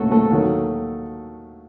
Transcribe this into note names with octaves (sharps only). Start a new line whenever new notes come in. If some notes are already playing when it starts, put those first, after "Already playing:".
Already playing: D#2 C#3 F#3 A3 F#4 A4
A3 A4
D#2 D#3 F#3